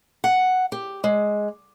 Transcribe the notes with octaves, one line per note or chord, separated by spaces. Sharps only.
F#5
G4
G#3